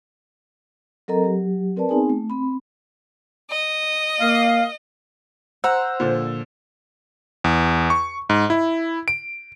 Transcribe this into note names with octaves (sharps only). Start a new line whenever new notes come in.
F#3 C4 A4 A#4 D#5 A#5
F#3 G4
C4 A#4 B4 D5 A5
B3 C4 D#4 G#4 G#5
A3
C4 B5
D#5
A#3 F5
C5 F#5 A#5 E6
A#2 D3 F3
E2
C#6
G#2
E4
D7